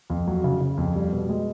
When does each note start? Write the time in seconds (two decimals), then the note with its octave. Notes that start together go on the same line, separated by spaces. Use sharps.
0.10 F2
0.27 F#3
0.44 C#3
0.61 C#3
0.78 F2
0.95 G3
1.12 B2
1.29 G#3